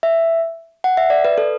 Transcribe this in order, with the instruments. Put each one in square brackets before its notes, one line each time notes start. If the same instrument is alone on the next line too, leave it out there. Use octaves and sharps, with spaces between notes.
[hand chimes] E5
F#5
E5
D5
B4
A4